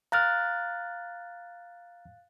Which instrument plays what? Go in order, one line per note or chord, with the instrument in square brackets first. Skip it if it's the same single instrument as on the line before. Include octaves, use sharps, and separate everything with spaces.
[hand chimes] F5 F#6 A6 [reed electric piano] A#5 F6